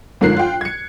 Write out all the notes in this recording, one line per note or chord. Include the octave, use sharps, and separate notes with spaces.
G1 G#2 F3 A#4 F#6 C7
F4 G5
G#6 C#7